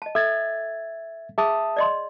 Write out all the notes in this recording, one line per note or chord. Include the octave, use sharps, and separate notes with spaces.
D#5 A5
A4 E5 G#6 A6
G#4 E5 A5 D#6
D5 D#5 C6